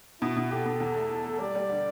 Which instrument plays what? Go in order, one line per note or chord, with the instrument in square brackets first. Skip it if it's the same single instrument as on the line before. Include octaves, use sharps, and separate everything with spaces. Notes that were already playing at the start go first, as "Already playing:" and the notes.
[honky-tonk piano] B2 [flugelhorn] E4
[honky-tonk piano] B2
[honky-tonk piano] G4 [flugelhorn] A4
[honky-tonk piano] B2
E2
A3
A3
A3
[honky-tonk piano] G3 [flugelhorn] D5
[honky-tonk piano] G3
D3